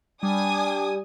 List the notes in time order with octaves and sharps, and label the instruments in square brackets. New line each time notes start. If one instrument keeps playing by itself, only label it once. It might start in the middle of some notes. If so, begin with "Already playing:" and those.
[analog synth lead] G3 [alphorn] D4 [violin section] G#5 D#6